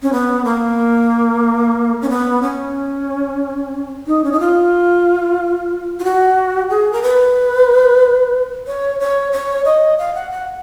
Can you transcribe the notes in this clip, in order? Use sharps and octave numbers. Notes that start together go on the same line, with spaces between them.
C#4
B3
A#3
C#4
B3
C#4
D#4
C#4
D#4
F4
F4
F#4
G#4
A#4
B4
C#5
C#5
C#5
D#5
F5
F#5
F#5